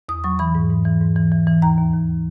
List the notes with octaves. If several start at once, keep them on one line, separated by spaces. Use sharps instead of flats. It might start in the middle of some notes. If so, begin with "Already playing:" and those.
E2 D#6
F#3 C#6
E3 B5
G#2
G#2
E3
G#2
E3
E3
E3
D#2 A#5
D#2
D#2